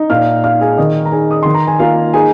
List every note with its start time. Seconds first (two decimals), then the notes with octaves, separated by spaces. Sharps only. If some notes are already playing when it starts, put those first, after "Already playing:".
Already playing: D#4
0.10 A#2 F5 F6
0.44 D#4 F5 F6
0.61 G#4 G#5
0.78 D#3 D#5 D#6
1.06 A#5
1.12 D#4 G#4 G#5
1.31 D#6
1.43 D#3 C6
1.55 A#5
1.67 G#5
1.79 A#3 F4 F5
2.13 D#4 G#4 G#5